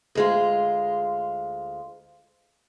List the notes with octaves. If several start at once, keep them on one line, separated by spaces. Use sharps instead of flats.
D2 G#3 F4